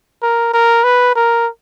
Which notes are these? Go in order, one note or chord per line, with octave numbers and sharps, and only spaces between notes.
A#4
A#4
B4
A#4